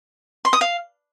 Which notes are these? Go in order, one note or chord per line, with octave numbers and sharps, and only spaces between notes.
C6
D#6
F5